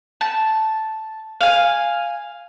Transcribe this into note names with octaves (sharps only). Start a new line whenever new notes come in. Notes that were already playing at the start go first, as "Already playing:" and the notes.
A5
F5 G#5